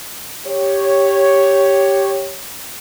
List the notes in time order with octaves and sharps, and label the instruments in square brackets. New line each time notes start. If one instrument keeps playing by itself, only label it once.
[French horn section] G4 C#5